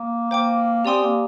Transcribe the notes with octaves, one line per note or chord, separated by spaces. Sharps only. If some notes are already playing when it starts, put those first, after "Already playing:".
Already playing: A#3
A#3 C5 G5 D6
C4 G4 D5 G#5 C6 D#6
A#3